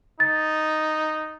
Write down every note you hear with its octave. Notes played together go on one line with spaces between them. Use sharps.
D#4 A6